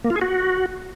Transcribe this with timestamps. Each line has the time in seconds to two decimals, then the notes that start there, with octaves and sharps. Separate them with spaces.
0.05 A#3
0.10 F4
0.16 G#4
0.21 F#4